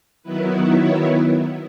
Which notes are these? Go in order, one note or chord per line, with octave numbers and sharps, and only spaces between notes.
D#3 F#3 B3 E4 B4
C#5